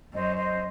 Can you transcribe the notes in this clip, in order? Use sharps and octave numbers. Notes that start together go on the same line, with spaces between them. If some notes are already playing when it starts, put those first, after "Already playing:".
F#2 C5 D#5
C5 D#5